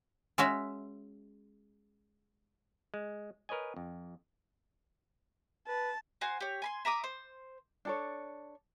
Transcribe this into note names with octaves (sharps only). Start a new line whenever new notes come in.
G#3 C#4 F#4 E5
G#3
A#4 B4 C#5 D#5 G#5
F2
B4 A5
F#4 C5 G#5
G4 C#5
G#5 B5 C6
E5 A#5 D6 D#6
C5
D4 A4 C#5